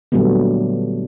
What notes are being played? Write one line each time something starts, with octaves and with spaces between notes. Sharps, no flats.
A#2 D3 F#3 G3 A3 B3